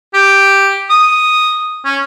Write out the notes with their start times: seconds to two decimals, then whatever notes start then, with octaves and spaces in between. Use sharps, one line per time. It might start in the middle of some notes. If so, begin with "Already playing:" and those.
0.14 G4
0.90 D#6
1.85 C#4